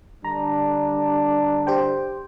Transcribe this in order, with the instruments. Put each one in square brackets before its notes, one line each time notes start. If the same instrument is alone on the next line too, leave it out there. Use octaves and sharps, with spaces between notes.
[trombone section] D3 G3 D4 [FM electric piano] A#5
[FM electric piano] G4 C5 G5